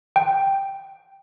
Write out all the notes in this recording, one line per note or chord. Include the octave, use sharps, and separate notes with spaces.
G5